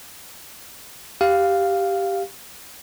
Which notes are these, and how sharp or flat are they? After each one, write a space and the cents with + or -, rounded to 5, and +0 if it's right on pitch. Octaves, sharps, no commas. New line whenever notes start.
G4 +0 F5 +0